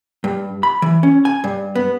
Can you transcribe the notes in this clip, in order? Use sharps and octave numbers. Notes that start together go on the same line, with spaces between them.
G2
B5
E3
C#4
G#5
G2
B3